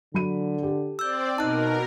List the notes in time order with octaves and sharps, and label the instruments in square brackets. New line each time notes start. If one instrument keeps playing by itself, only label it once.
[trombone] D3 [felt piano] F#3 B5 D#7
[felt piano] G4 A4
[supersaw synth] C4 D5 [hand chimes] E6 G6
[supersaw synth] B2 A#4 [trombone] D#4 [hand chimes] A5 F#6